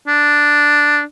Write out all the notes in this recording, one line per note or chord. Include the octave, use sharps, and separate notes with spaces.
D4